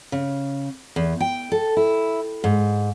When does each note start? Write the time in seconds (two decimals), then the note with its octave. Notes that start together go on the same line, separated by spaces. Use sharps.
0.12 C#3
0.96 E2
1.20 G5
1.52 A4
1.77 E4
2.44 G#2